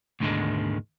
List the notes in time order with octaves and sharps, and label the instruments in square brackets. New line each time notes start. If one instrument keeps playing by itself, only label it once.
[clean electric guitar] D2 G#2 B2 D3 D#3 G#3